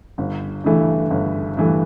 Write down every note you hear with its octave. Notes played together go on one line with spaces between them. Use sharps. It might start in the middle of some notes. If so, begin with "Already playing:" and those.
G1
G2 E3 A3
G1
G2 E3 A3